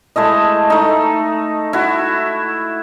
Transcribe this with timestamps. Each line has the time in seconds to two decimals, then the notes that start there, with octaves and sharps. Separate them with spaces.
0.16 G#3 A3 E4 D#5
0.70 A3 D#4
1.73 E4 F#4